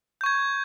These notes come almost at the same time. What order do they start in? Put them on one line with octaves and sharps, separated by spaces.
G6 C#6 G#6